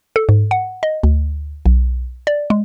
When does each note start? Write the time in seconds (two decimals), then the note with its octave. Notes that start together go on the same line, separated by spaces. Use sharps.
0.16 A4
0.29 G#2
0.51 F#5
0.83 D#5
1.03 D2
1.66 B1
2.27 D5
2.50 G#3